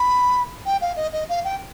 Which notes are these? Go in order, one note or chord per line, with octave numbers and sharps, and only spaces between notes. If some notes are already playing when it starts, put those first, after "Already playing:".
Already playing: B5
G5
F5
D#5
D#5
F5
G5